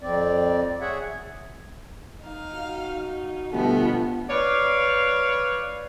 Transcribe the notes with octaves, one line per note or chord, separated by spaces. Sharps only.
F2 C4 D5
G#4 C#5 E5 F#5
D#4 F5
F#4
G1 B2 F3 A3 B3
B4 C#5 D5 F5